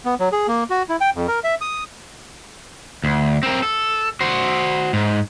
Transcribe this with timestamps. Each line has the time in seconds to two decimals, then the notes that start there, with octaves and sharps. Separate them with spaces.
0.05 B3
0.20 F#3
0.32 G#4
0.48 A#3
0.70 F#4
0.89 E4
1.01 G5
1.15 F2
1.28 A#4
1.44 E5
1.61 D#6
3.04 D2
3.43 C4 A#4
3.63 A4
4.21 F#4 C5
4.93 G#2